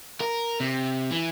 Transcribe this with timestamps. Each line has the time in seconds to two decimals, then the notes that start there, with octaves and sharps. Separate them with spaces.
0.21 A#4
0.60 C3
1.11 E3